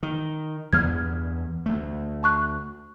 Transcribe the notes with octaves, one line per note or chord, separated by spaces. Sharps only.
D#3
E2 G2 B3 F6 G#6
D2 A3
A5 C#6 F#6